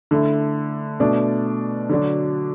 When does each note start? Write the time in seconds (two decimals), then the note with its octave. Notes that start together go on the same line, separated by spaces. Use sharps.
0.11 D3 A3 E4
1.00 B2 A3 D4
1.89 D3 F#3 D4 F#4